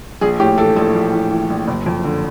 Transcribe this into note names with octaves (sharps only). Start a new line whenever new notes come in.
A#1 G#4
A2 G4
E3 A4
A#1 A4
A#1
A2
E3
A#1
F#1
F2
D3